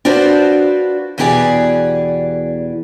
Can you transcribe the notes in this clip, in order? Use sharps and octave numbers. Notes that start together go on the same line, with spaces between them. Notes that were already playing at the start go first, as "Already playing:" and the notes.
D4 F4 F#4 B4 C5 D5
E2 B2 E3 G4 G#4 D5